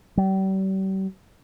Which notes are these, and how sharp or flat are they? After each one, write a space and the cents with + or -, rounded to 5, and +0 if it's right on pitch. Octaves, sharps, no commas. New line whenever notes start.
G3 -40